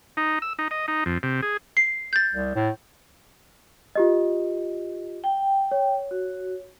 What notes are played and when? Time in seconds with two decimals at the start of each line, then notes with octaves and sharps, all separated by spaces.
0.17 D#4
0.42 E6
0.59 D#4
0.71 D#5
0.88 D#4
1.06 F2
1.23 C3
1.42 G#4
1.77 C7
2.13 G6 A6
2.33 C2
2.55 A2
3.95 F4 G4 D#5
5.24 G5
5.71 C#5
6.11 F#4